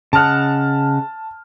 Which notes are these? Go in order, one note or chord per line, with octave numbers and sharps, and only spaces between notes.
C#3 D#5 F#5 A5 F6